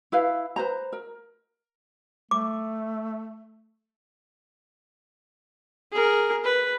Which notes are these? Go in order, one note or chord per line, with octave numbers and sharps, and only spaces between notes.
E4 B4 F5
B4 C5 A#5
A#4
A3 D6
G#4 A#4
B4